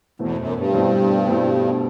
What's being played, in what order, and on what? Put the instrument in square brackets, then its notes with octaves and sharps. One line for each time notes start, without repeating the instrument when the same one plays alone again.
[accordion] E2 [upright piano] B2 A3 C4 E4
[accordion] F#2
G2
[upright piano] B2 A3 C4 E4
B2 A3 C4 E4